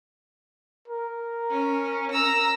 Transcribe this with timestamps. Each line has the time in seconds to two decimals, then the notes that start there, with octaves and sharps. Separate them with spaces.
0.88 A#4
1.50 C#4
2.11 A#5 E6